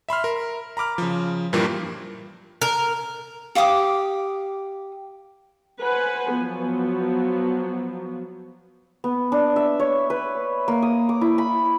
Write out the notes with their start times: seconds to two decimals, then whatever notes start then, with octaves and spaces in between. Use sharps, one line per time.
0.09 E5 B5 C6 F6
0.24 A#4
0.77 A#5 B5 D6 F6
0.98 C#3 F3
1.53 G2 A#2 E3 F3 G3 A#3
2.62 A#4
3.55 G4 F5 D6 D#6
5.80 B4 C5 F#5 G#5
6.35 F3 F#3 B3
9.04 B3
9.32 D4
9.56 E5
9.80 C#5
10.10 B4
10.68 A#3
10.82 D#6
11.09 D6
11.21 E4
11.38 B5